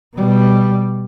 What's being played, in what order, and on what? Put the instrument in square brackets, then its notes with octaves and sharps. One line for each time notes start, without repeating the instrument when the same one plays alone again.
[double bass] B2 G3